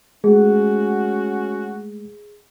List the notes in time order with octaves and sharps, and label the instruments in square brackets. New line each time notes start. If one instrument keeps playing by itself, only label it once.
[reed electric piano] G#3 A3 [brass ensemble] C#4 F#4 [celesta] G#4